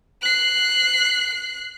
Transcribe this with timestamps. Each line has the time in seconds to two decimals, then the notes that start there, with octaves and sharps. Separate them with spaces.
0.21 F#6 C7